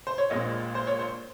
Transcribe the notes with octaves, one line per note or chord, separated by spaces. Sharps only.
C5
C#5
A#1 A#2 G#3 C4 D#5
C5
C#5
C5